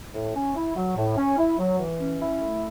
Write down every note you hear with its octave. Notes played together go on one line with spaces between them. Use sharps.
A2
C#4
E4
F#3
A2
C#4
E4
F#3
E3
C#4
E4
A3